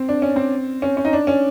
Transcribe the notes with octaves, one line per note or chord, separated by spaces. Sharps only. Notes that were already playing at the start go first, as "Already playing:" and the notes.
Already playing: C4
D4
C#4
C4
C#4
C#4
D#4
D4
C#4